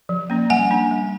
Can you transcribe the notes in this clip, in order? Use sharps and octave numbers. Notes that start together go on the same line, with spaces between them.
F3
A#3 C#4
G3 F#5 G#5
A#3 D4
G3